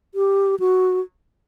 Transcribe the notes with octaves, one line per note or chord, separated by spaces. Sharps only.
G4
F#4